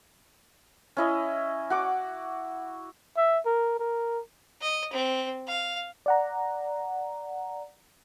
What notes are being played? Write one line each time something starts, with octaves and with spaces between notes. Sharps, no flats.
C#4 E4 D#5
F#4 F#5 D6
E5
A#4
A#4
D#5
C4
F5
D5 F#5 A#5